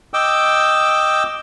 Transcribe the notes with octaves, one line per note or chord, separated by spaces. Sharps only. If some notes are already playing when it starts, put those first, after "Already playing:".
D#5 G5 D6 E6